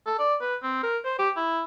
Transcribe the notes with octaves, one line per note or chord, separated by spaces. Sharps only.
A4
D5
B4
C4
A#4
C5
G4
E4